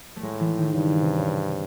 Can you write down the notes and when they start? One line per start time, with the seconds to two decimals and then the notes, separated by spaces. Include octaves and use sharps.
0.16 A3
0.22 A2 G#3
0.40 E3
0.57 D#3
0.74 G2 C#3
1.01 C3
1.18 C#3
1.27 C3